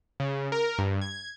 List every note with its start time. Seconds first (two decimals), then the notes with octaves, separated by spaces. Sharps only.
0.20 C#3
0.52 A#4
0.78 G2
1.01 G#6